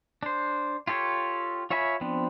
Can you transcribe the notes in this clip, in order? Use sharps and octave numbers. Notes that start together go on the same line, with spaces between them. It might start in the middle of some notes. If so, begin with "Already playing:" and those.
D4 C5
F4 G4 A4 C#5
F4 C#5 E5 G#5 B5
F3 B3 C4 D4